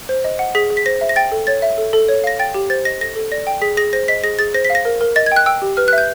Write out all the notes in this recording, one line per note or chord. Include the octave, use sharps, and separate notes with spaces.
C5
D#5
F#5
G#4 B6
G#4
B6
C5 A#6
E5
A#6
G5 A6
A4
C#5 A6
E5
A4
A4
C#5
F5 A#6
G5 A6
G4
C5 A6
D#5 A#6
A4 A#6
A4
D5 A#6
G5
G#4 B6
G#4 A#6
C5 A#6
D#5 B6
G#4 A#6
G#4 A6
C5 A#6
B6
F5
A#6
A#4
A#4
D#5 A6
G#6
G5 F#6
G5 E6
G4
B4 F6
F#6
E5
G6